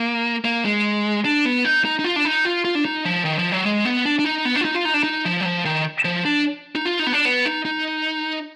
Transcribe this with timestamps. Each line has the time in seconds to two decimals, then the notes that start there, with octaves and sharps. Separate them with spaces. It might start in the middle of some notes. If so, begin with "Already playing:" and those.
Already playing: A#3
0.45 A#3
0.65 G#3
1.25 D4
1.45 B3
1.65 D#4
1.85 D#4
1.99 D#4
2.04 F4
2.16 D4
2.25 D#4
2.45 F4
2.65 F4
2.75 D4
2.85 D#4
3.05 F3
3.25 D#3
3.39 F3
3.52 F#3
3.65 G#3
3.85 B3
4.05 D4
4.19 D4
4.25 D#4
4.45 B3
4.55 D4
4.61 F4
4.65 D#4
4.75 F4
4.85 D#4
4.94 D4
5.03 D#4
5.25 F3
5.41 F#3
5.45 F3
5.65 D#3
6.05 F3
6.25 D4
6.75 D#4
6.85 F4
6.99 D#4
7.07 B3
7.13 D4
7.25 B3
7.46 D#4
7.65 D#4